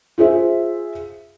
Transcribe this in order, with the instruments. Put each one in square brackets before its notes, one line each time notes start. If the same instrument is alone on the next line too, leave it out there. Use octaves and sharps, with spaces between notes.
[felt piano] F4 G#4 C5 E5